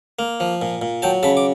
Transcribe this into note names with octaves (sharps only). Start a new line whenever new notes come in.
A#3
F3
A#2
A#2
F#3 G5 A5
C#3 A5 B5
D6